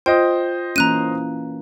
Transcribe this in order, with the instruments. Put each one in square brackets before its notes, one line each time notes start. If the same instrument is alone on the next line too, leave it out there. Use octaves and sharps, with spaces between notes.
[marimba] F4 [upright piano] C5 D#5 [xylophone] G5
[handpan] E3 A#3 C#4 [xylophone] A#5 F#6 D#7